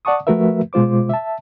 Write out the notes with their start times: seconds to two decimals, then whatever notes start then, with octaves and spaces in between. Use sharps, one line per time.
0.05 D5 F#5 A5 C#6 D#6
0.27 F3 A3 F#4 A#4 B4 E5
0.73 B2 G#3 F4 C5 D6
1.09 E5 A5